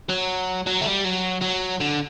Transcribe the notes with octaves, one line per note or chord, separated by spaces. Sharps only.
F#3
F#3
A3
G3
F#3
F#3
D3